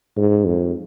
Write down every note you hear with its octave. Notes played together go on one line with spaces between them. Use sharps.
G#2
F2